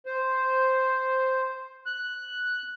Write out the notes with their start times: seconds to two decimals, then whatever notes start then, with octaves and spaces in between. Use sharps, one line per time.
0.06 C5
1.86 F#6